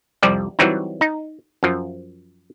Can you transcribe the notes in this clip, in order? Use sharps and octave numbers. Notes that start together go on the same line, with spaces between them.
C2 F2 F3 G3 G4 D5
E3 F#3 G3 C4 D#4
D#4
F#2 F3